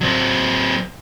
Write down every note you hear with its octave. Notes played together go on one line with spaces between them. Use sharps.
F#3 C4